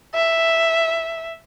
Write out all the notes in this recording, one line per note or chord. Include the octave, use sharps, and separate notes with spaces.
E5